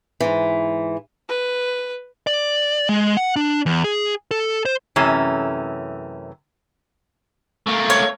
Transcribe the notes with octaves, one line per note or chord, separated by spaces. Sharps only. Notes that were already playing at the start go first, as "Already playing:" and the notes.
G#2 E3
B4
D5
G#3
F#5
D4
E2
G#4
A4
C5
F#2 C3 E3 A3 C#4
A3 A#3
C#5